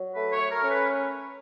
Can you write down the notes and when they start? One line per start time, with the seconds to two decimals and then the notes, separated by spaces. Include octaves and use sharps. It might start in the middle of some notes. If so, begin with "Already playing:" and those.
Already playing: F#3
0.14 A3 B4
0.33 C#5
0.38 A3
0.51 A#4
0.63 C#4
0.69 B4